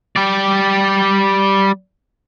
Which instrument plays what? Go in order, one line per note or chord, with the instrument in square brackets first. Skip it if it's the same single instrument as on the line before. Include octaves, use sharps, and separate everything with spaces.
[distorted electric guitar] G3 D5